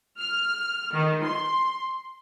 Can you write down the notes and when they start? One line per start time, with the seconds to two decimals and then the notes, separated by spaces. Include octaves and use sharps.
0.19 F6
0.92 D#3
1.23 C6